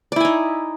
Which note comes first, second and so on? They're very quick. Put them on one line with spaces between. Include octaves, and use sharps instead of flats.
D5 E4 G#5 D#4